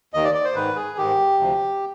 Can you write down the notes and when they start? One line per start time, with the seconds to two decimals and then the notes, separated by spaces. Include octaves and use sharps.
0.14 D#2 D#3 D#5
0.24 D5
0.35 D5
0.44 C5
0.55 G#2 D#3 B4
0.76 G#4
0.97 G#2 D#3 G4
1.39 D2 C3 F3